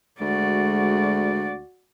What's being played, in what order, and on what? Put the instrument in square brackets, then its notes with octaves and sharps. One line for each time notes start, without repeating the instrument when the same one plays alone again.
[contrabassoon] D2 [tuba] G#3 [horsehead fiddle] F#4 D5